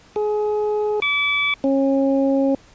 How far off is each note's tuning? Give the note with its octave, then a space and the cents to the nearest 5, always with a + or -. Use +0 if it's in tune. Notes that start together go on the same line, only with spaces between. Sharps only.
G#4 +25
D6 -35
C#4 -30